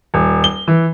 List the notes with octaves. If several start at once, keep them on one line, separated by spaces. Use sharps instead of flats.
D#1
G7
E3